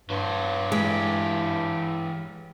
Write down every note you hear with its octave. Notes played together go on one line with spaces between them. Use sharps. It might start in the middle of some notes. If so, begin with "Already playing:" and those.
G2 F#3 C5
E3 G#3 G4